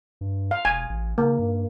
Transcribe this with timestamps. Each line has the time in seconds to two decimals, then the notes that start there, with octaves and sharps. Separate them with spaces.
0.21 G2
0.51 F5
0.65 E1 G#5
0.89 A1
1.18 C#3 A#3
1.39 G2